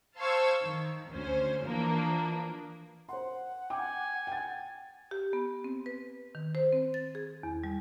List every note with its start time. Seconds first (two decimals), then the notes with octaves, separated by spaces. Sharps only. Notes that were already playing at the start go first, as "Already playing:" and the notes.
0.17 C5 F5 A5 C#6 E6 G#6
0.62 D#3
1.11 D2 C#4 C5
1.64 E3 F3 A#3 D4
3.09 C5 F#5 C6
3.70 G5 G#5 D6
4.27 G5 A6
5.11 G4
5.33 B3
5.64 C4
5.86 B4
6.35 D#3
6.55 C5
6.73 C4
6.94 A6
7.15 G#4
7.43 E2
7.64 G3